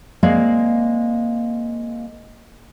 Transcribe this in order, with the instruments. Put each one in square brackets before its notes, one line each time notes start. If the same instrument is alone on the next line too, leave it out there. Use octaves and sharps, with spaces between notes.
[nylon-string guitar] G#3 A#3 C4 D5 F5